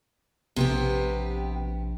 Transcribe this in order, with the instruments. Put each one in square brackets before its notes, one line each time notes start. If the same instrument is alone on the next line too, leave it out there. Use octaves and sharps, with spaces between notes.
[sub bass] A#1 [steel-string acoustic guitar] C3 B3 G4